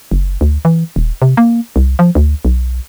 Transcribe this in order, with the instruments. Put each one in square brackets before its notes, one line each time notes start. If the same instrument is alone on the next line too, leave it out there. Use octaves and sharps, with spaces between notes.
[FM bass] F#1
D2
E3
D#1
C3
A#3
C2
F3
D2
B1